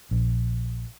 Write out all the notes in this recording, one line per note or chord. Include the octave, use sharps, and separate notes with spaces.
A#1